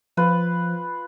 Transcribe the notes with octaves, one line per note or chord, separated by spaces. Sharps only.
F3 F4 B4